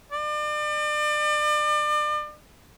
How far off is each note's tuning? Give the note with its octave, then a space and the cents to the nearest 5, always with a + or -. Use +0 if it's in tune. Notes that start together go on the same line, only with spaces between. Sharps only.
D5 +35